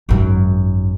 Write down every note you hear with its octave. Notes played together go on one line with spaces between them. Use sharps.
G#1 F#2